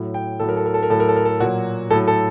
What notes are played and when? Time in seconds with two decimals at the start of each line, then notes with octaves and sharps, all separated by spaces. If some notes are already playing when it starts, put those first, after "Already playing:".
Already playing: A2 F#3
0.14 G5
0.40 A2 F#3 A4
0.49 A#4
0.57 A4
0.66 A#4
0.74 A4
0.83 A#4
0.90 A2 F#3 A4
1.00 A#4
1.09 A4
1.16 A#4
1.25 A4
1.40 A#2 F#3 F#4
1.91 A2 F#3 A4
2.08 A4